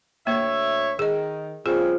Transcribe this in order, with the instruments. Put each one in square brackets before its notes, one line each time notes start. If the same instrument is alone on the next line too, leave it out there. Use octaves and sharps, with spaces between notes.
[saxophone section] D2 C#5 E5 [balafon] A#3
[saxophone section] D#3 [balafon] G#4 D#5
[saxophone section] C#3 G3 C4 [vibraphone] F4 C5 [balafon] G#4